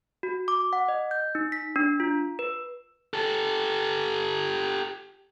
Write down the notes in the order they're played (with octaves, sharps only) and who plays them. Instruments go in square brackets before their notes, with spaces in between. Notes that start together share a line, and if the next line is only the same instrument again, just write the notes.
[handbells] F#4
D6
F#5
D#5
G6
D#4
B6
D4
F4
B4
[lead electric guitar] G4 A4